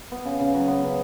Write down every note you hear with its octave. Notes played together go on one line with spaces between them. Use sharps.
B3
C#3
C#3
F#3
B3
C#3